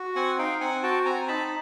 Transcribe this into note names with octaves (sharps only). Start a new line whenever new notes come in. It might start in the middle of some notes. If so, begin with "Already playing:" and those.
Already playing: F#4
C4 F#5 G#5
D#4 F5 G5
C4 F#5 G#5
F#4 G5 A5
C4 G#5 A#5
D#4 A5 B5